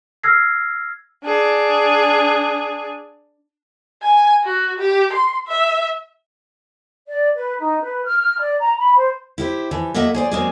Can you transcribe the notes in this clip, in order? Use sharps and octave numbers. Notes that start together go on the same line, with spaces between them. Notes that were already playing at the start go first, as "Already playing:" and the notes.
E6 F6 G#6 A#6 C7
D4 G#4
G#5
F#4
G4
C6
E5
D5
B4
D#4
B4
F6
F6
D5
A#5
B5
C5
E4 G4 C5
E3 F3
A#3 A4 D#5 E5 F#5
G#4 C5 D5
F#3 G#3 A#3 C4 D4 G#4